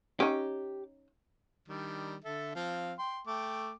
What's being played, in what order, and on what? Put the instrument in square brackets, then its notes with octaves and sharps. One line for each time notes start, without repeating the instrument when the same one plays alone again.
[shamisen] C#4 D#4 [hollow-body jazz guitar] G4
[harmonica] D#3 G3 D4
D3 A4 E5
F3 C4 F5
G5 C6
A3 G5 D6